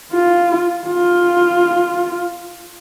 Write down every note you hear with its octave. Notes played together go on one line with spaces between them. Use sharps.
F4
F4